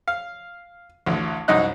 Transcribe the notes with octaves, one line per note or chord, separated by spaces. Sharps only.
F5
A1 D2
C2 F#2 D#4 D#5 F#6